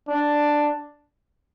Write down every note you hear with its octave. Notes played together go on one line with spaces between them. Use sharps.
D4